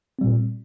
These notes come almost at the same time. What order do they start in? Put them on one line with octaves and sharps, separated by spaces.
C4 G3 A#2